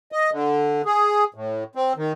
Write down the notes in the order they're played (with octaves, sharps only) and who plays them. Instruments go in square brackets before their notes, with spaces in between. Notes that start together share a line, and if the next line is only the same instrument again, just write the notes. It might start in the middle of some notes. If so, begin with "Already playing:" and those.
[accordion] D#5
D3
G#4
A2
C4
D#3